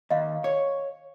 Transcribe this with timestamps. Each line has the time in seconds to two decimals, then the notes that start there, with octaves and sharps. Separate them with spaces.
0.10 D#2 D#5 F5
0.44 C#5